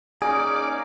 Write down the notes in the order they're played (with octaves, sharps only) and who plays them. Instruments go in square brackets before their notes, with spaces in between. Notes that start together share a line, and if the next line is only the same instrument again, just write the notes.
[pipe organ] A#3 C#4 D#4 [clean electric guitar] G#4 [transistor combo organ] D5